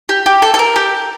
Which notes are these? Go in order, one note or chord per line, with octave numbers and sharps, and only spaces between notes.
G4
G4
A4
A4
A#4
G4